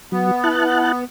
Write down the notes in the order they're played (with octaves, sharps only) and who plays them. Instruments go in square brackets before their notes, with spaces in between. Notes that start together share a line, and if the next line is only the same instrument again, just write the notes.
[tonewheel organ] F#3 [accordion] B3
[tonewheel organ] E4 A5 F#6